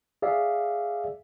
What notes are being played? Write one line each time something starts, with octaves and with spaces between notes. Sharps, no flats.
G#4 D5 E5 F5